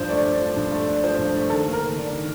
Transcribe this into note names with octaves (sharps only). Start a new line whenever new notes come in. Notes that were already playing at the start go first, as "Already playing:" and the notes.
Already playing: G2 F3 D4 C5
A3 D5
D4
F3
G2
A3
D4
F3 C5
G2
A3
D#3 A4
A#3
A#4
D#3
D4
D#3